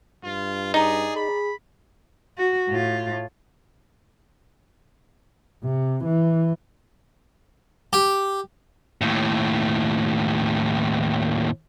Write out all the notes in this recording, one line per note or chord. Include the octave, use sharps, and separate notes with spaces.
G2 F4
D#4 G#4 D5 A#5
G#4 B5
F#4
A2 F4
C3
E3
G4
D#2 A2